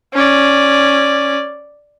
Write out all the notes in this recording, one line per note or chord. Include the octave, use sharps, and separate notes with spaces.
C#4 D5